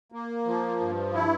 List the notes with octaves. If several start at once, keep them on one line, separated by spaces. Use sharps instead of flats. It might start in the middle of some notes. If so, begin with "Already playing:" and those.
A#3
F3
G2
E4